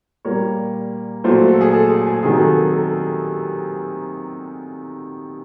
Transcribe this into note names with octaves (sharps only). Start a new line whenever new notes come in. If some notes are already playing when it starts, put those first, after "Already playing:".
A#2 G3 A#3 C#5
A#2 F#3 A3 C5
A4
G#4
A4
G#4
G#4
C3 D#3 F#3 G#4
A4
A#4
A4